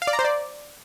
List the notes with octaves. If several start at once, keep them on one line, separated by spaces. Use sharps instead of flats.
F5
D5
A#5
C5
D5